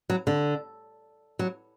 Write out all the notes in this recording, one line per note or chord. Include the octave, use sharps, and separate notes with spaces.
F#3
D3
F#3